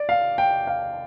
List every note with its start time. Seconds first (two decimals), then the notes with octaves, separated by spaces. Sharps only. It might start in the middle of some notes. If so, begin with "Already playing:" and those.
Already playing: D5
0.09 F5
0.38 G5
0.67 F5